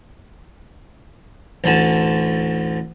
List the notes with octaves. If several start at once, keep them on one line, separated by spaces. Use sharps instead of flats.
A1 D2 D3 G#5 A5